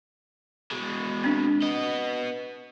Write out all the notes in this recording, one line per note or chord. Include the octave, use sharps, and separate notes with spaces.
B2 G#3
C4 D4
B3 D#5